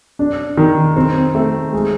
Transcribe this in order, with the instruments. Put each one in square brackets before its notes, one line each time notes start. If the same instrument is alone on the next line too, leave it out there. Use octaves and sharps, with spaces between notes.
[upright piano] D4
D#3
C4
A3
G#3